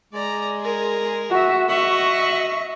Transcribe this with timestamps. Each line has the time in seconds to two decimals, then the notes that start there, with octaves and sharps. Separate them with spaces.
0.13 G#3 D5 A#5
0.60 G#4 A#4
1.30 F#4 E5
1.69 F#4 D#5 E5 C#6